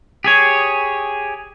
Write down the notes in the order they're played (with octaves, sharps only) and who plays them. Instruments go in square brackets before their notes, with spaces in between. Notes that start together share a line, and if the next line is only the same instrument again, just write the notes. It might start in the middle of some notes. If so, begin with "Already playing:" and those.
[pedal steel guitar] G4 G#4 C#5